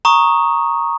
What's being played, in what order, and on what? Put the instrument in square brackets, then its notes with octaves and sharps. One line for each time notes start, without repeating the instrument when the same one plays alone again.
[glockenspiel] A#5 C#6 D#6